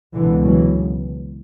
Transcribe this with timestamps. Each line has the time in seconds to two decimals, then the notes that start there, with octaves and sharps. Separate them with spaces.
0.14 C#2 B2 D3 E3
0.43 E3 F#3